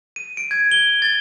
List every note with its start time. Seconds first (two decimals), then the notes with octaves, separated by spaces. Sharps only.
0.16 D#7
0.37 D7
0.51 G#6
0.71 G7
1.02 A6